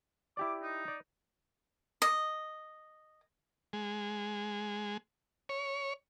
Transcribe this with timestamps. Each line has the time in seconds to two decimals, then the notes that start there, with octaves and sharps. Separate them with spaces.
0.37 E4 G4 D5 D6
0.62 D#4
0.88 D5
2.02 D#5
3.73 G#3
5.49 C#5